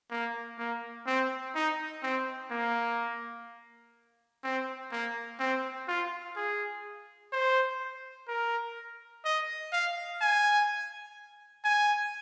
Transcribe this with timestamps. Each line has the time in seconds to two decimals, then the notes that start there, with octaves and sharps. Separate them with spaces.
0.11 A#3
0.59 A#3
1.06 C4
1.55 D#4
2.03 C4
2.51 A#3
4.44 C4
4.92 A#3
5.40 C4
5.88 F4
6.36 G#4
7.32 C5
8.28 A#4
9.25 D#5
9.73 F5
10.21 G#5
11.65 G#5